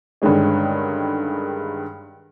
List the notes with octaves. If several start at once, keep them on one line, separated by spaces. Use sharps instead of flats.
G2 D3 D#3 G#3 C#4